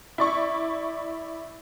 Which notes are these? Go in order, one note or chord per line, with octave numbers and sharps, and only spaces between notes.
E4 D5 C#6